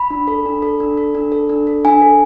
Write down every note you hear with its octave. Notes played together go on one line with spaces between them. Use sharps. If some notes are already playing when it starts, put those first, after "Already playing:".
Already playing: B5
D4
A4
D4
A4
D4
A4
D4
A4
D4
A4
D4 G#5
A4